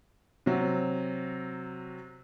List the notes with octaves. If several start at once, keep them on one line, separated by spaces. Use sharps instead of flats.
C3 F#3